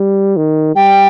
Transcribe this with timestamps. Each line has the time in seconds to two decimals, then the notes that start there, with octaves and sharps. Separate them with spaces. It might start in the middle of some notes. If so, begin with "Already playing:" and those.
Already playing: G3
0.37 D#3
0.76 G3 G5